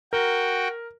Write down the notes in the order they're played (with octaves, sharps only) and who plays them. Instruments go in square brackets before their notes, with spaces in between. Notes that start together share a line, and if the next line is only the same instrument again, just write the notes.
[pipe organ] F#4 G5 [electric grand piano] A#4